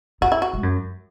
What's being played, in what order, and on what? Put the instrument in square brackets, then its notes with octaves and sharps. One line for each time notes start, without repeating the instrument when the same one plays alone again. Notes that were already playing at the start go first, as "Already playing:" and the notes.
[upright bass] F#2 [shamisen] F#4
[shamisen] E4
F#4
[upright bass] G#2
F#2